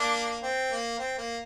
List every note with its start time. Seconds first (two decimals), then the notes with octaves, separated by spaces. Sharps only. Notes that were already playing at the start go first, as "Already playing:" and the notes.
Already playing: A#3 D4
0.43 C4
0.71 A#3
0.99 C4
1.18 A#3